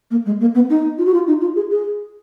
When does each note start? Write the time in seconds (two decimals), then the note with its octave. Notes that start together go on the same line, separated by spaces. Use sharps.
0.11 A#3
0.26 G#3
0.40 A#3
0.55 B3
0.70 D#4
0.98 F4
1.05 F#4
1.14 F4
1.27 D#4
1.41 F4
1.56 G#4
1.70 G#4